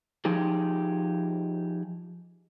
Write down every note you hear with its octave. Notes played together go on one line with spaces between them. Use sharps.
F3 D#4 G4 G#4